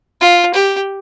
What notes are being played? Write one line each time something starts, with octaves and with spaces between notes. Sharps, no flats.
F4
G4